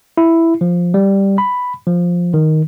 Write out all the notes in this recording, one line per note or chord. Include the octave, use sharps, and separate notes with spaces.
E4
F3
G3
B5
F3
D#3